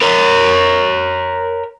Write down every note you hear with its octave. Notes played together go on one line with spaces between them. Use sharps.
A#4 C#5